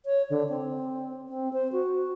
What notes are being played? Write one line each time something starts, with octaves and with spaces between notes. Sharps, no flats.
C#5
D3
C4
C4
C5
F#4